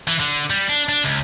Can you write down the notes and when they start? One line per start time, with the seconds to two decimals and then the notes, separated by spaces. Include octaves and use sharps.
0.08 E3
0.20 D3
0.50 G3
0.69 D4
0.89 D4
1.04 C#2